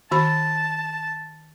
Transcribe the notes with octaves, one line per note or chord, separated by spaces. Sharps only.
D#3 F#4 A5 B5